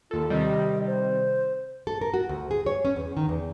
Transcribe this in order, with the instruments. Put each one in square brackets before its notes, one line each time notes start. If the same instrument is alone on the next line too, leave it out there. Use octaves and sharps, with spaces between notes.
[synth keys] D#2 A4 [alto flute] F4
[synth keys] C3 D#3 G3 [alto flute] D#5
[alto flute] C5
[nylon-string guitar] A4
A#4
F#4
D2
G#4
C#5
C#4
E2
D#3
E2